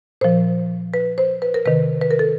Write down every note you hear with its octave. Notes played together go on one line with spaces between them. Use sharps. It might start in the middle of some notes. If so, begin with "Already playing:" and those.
A#2 F3 C5
B4
C5
B4
A#4
C3 D#3 B4
B4
A#4
A4